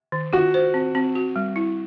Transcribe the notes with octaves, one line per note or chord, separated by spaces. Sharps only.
D#3
F4 F#4
C5
C4
C4
F#4
G3
E4